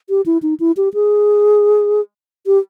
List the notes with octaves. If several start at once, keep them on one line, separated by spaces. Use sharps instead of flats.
G4
E4
D#4
E4
G4
G#4
G4